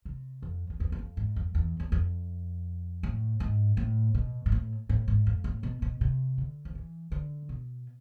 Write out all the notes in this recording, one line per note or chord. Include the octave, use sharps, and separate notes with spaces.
C3
F2
F2
E2
E2
F2
G#2
F2
E2
E2
F2
A2
G#2
A2
B2
G#2
A2
A2
G#2
F2
A2
B2
B2
C3
D3
F3
E3
D3
B2